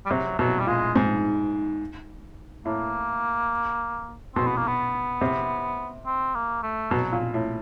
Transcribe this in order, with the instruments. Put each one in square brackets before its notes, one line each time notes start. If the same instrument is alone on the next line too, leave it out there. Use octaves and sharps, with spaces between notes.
[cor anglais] G3
[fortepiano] C3 [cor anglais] F#3
[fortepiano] B2 [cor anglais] F#3
[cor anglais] G3
[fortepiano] A#2 [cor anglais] G#3
[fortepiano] G#2
[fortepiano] A2 [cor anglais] A#3
[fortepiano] B2 [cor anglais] C4
[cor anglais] B3
A#3
B3
[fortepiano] C3
[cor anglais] C4
A#3
A3
[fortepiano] B2 [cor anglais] F#3
[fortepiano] A#2
A2